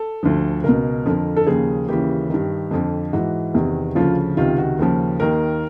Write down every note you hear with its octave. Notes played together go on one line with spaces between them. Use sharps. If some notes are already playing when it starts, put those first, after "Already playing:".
Already playing: A4
D2 D3 F3
C#2 B2 A#4
F2 D3 F3
A4
D#2 C#3 F3 G#4
D#2 C#3 E3 G4
G2 D#3
F2 D3 F3
G#2 E3 F#4
E2 C3 D#3
D2 C#3 F3 F4
C#2 C3 D#3 F4
F#4
D#2 C#3 F3
D#2 D#3 A#4